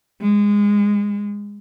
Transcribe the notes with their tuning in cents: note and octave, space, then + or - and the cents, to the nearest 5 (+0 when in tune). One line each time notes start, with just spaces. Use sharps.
G#3 -20